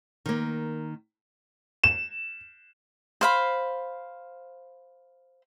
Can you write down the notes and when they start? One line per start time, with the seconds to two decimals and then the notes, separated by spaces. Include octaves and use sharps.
0.26 D#3 A#3
1.84 E7
3.21 C5 F5 B5